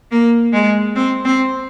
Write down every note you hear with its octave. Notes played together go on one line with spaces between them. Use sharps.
A#3
G#3
C4
C4